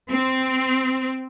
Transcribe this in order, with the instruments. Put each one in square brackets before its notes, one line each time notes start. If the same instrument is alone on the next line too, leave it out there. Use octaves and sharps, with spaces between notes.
[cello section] C4